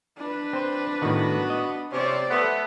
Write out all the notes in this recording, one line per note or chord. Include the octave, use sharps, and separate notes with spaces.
D4 B4
C4 C5
A2 D#3 B3 F#4
D#5
C3 C#4 C5 D5
A3 B3